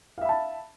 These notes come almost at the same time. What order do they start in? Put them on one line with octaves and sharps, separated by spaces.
F5 E5 B5 A5